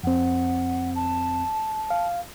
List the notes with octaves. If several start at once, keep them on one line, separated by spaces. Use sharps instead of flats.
F2 C4 F#5
A5
F5